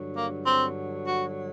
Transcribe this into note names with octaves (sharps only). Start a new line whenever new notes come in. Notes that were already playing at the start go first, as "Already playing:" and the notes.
Already playing: G2 D3 F#3
A#3
C4
F#4